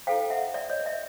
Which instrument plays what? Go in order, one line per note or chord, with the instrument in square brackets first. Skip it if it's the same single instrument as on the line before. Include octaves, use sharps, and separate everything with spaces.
[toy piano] E4 A4 C5 F5 G5
E5 F#5
D5 E5
C#5 D#5
D5 E5